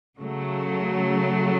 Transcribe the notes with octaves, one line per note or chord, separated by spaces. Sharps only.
C#3 F#3 A3